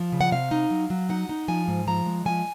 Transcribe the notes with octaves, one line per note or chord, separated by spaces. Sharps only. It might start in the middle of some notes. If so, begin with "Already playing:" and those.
Already playing: F3
C#3
F#5
C3 F5
D#4
F#3
F#3
D#4 F#5
D#4
F3 G#5
G#2
F3 A#5
G#3
F3 G#5